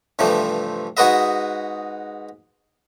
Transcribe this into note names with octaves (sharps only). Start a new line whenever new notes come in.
G2 C3 E3 F3 A3
G#2 F#4 G#4 B4 D#5 E5